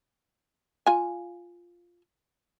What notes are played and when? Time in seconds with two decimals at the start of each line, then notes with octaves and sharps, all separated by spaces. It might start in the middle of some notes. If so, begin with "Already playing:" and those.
0.86 F4 G#5